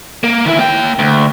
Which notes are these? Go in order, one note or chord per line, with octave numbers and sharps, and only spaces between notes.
A#3
D#3 E4
A#3 G5
D2